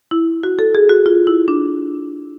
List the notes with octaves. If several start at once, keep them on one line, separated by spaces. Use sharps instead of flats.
E4
F#4
A4
G#4
F#4
F4
E4
D4